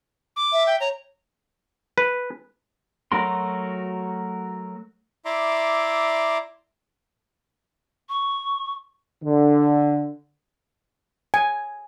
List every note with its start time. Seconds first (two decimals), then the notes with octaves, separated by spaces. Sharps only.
0.36 D6
0.52 E5
0.67 G5
0.80 C#5 A#5
1.98 B4
3.12 F#3 A3 F#4 A#4 C6
5.25 E4 D5 E5 A#5 C6 D6
8.09 C#6
9.23 D3
11.34 G#5